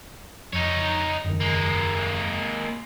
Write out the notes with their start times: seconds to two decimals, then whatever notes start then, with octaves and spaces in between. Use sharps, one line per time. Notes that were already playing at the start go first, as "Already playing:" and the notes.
0.53 F2 D#4 C#5
1.24 F#1 E2 D#3
1.40 G#3 A#3